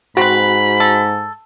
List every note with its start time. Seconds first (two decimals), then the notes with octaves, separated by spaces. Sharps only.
0.17 G#2 C4 F#4 B4 B5
0.80 A4